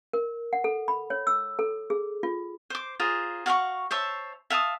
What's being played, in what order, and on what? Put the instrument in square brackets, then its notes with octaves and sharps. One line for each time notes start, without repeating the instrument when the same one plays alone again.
[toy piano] A#4
F#5
A4
B5
C#5
E6
A4
G#4
F4
[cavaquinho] C5 D6
F4 G#4 C5 A#5
F#4 F5 F#5 C#6
C5 C#5 E5 A5
E5 F5 A5 D#6